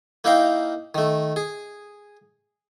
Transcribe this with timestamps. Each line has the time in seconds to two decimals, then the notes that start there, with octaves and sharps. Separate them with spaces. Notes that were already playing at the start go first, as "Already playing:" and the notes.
0.24 A#3 D#4 E4 A#4 F5 G5
0.95 D#3 A3
1.36 G#4